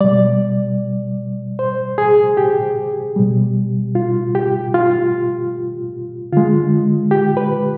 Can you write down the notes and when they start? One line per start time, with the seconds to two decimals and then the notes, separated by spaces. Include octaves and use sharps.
0.01 B2 G3 D5
1.59 C5
1.98 G#4
2.37 G4
3.16 B2 G3
3.95 F4
4.35 G4
4.74 F4
6.32 D3 G#3 F4
7.11 G4
7.37 B4